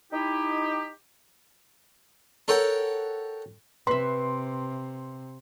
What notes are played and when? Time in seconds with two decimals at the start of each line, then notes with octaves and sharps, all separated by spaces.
0.12 D#4 E4 G4
2.48 A4 A#4 C#5 F#5 G5
3.87 C3 B4 E5 C6